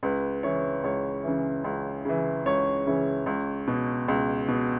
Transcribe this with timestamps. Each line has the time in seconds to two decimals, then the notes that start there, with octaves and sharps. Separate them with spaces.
0.03 C#2 B4
0.43 C#3 E3 C#5
0.84 C#2 C#5
1.24 C#3 E3
1.64 C#2
2.05 C#3 E3
2.46 C#2 C#5
2.87 C#3 E3
3.26 C#2
3.67 B2
4.08 C#2
4.48 B2